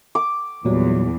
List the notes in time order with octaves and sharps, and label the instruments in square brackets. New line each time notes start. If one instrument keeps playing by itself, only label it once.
[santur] D6
[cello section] E2 [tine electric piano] A#2 F#3 G3